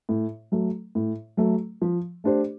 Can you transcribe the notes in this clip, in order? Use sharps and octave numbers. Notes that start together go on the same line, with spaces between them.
A2
F#3 A3
A2
F#3 A3
F3
A3 D4 G4 C5